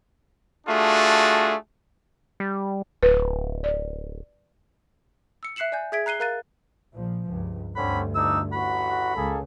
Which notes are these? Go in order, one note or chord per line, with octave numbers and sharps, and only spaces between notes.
A3 D4 F4 F#4 G#4
G3
D1 B4
D5
E6 C#7
E5 F#6 C7 C#7 E7 F#7
D5 G#5 G6
G#4 E5 G#6 B6 D7
A#5 F#6 C7 D#7 G7
A#4 F5 A#5 F#6 A6 D#7
A#1 A#2 F3
C#2 G2
D2 G2 D3 C4 C#4 B5
F2 D4 D#4 E6
A1 F#4 B5
C#2 A#3 G#4 A4